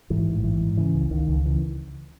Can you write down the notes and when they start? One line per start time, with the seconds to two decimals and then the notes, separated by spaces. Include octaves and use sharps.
0.10 G#2 E3
0.28 A1
0.44 G#2 E3
0.61 G#2
0.77 C#3 E3
0.95 C#2
1.11 C#2 D#3
1.29 C#2
1.45 C#3 E3